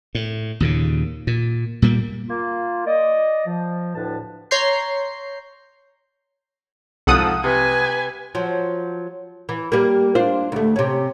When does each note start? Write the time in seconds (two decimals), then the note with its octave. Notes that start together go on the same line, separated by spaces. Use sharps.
0.15 A2
0.60 D#2 A#2 C#3
1.27 A#2
1.82 A#2 G3 A#3
2.28 A#3 F4
2.85 D5 D#5
3.45 F3
3.94 D2 A2 D4 B4 A5
4.51 C#5 A#5 C6 G6 C7
7.07 C2 G#2 F3 A4 F#5 D#6
7.44 C3 B4 G#5
8.35 F3 F#3
9.49 E3
9.72 G3 A#3
10.15 D4 F4 C5
10.52 D2 A3
10.76 C3 C#4